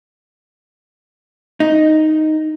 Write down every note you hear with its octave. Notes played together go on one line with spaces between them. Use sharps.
D#4